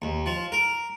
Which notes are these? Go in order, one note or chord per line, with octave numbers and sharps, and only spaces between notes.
D#2
F3
A#4